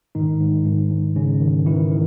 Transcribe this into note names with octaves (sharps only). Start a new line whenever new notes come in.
G#2 D#3 D#4
G#2
G#2
G#2
G#2 C#3 C#4
D#3
D#3 E3 E4
D#3